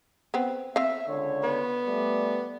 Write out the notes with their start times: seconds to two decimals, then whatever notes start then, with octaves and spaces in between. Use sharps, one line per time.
0.34 B3 C4
0.76 C4 E5 F5
1.08 C#2 D3 C#5
1.43 B3
1.87 G3 A3 D5